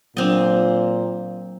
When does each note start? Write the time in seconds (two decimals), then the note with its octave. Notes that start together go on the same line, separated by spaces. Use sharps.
0.17 A#2 F#3 C4 D4 D#5